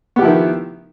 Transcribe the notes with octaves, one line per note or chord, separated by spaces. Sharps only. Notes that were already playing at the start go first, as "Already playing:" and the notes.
D#3 F3 B3 E4 G4